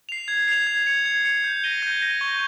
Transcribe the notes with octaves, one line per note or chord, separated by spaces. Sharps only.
C7 F7
G#6
C7 F7
G#6
C#7 F7
G#6
C#7 F7
G6
A#6 D#7 G7
G6
A#6 D#7 G7
C#6